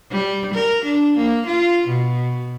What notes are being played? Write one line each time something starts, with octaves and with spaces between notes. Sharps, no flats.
G3
A#4
D4
A#3
F4
B2